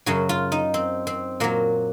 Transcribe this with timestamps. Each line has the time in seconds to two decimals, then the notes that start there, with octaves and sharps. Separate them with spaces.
0.06 F#2 C#3 F#3 F#4
0.29 F4
0.52 D#4
0.74 C4
1.07 C4
1.40 A#2 F#3 A#3